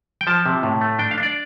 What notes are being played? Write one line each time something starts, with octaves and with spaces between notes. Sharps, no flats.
G5
F3 A5
C3
A2
A3
D4 G5
F5
D4
D5